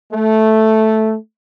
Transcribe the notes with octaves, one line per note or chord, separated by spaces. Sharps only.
A3